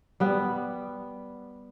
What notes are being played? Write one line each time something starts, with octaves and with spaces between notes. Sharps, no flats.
G3 B3